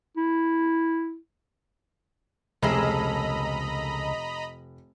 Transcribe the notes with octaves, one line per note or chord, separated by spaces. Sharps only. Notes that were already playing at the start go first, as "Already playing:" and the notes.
E4
F1 C#2 A#3 G#4 A4 D#5 A#5 B5